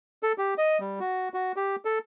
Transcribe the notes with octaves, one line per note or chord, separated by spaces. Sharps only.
A4
G4
D#5
G3
F#4
F#4
G4
A4